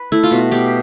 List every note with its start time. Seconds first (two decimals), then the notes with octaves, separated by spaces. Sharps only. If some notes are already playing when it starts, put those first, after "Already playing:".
Already playing: B4
0.12 A3 E4
0.23 F4
0.31 B2 F#4
0.51 B2 G4